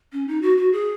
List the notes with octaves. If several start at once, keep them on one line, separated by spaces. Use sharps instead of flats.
C#4
D#4
F#4
F#4
G#4